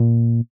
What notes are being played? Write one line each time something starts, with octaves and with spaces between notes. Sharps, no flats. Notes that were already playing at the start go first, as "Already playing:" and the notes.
Already playing: A#2